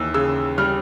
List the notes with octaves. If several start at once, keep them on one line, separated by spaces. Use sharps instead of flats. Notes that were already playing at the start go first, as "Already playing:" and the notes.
Already playing: D#2 E3 E6
C#3 E6
G3 F6